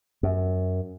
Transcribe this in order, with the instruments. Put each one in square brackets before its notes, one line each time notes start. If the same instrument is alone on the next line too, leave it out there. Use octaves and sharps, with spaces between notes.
[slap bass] F#2